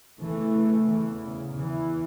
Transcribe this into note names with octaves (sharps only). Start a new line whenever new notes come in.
E2 C#3 E3 A3
E3
C#3
E3